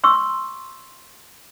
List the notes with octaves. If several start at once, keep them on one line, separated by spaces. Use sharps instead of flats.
C6 C#6 E6